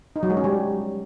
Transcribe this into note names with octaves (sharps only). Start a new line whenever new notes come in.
D#4
F#3
G#3
C#4
G3